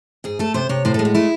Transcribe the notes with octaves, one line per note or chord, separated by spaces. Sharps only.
G#2 G#4
A3 A4
C3 C5
C3 C#5
A2 C5
A4
G#3
F#4
A3 E4